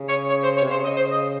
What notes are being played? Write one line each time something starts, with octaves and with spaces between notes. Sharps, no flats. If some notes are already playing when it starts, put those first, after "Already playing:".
Already playing: C#3
C#5
C#5
C5
C#5
C3
C#3 C5
D#5
C5
D#5